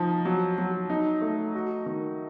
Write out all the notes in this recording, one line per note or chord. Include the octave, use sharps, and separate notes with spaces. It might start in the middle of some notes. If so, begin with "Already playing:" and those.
Already playing: F3 D#4
F#3
F#3
D#4
A3
F#4
D#3